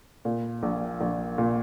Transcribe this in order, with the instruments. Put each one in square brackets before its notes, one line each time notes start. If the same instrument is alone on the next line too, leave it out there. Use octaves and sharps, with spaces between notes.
[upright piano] A#2
A#1
A#1
A#2